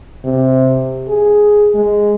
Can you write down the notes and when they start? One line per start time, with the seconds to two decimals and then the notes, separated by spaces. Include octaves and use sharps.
0.25 C3
1.08 G#4
1.75 G#3